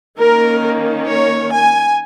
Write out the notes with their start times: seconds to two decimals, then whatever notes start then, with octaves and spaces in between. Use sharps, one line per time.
0.18 D#3 A#3 C#4 A#4
1.07 C#5
1.51 G#5